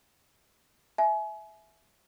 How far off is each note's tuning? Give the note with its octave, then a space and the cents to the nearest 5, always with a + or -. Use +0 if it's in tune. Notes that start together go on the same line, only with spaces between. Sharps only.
E5 +0 G#5 +35